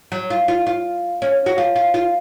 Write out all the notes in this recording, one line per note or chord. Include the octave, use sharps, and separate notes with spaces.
F#3
F4
F4
F4
C#4
F#4
F4
F4
F4